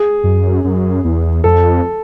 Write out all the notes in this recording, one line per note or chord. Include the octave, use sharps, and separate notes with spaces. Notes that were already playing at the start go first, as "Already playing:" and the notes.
Already playing: G#4
F#2
F#2
E2
F2 A4